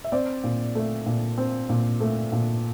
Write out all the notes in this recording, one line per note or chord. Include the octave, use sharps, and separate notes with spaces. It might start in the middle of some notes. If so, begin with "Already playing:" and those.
E5
C4 D5
A#2
A3
A#2
C4
A#2
A3
A#2